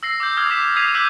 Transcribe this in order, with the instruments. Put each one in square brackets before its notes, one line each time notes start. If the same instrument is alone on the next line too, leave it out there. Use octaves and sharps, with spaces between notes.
[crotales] E6 A#6 C7
D6 E6 G6
D6 D#6 F6 G#6 A#6
D6 B6 E7
D#6 G#6 B6 C7 D#7 F7
D6 E6 F#6 G6 B6 D#7